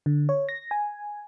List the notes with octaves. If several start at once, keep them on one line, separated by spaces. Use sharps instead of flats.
D3
C#5
A#6
G#5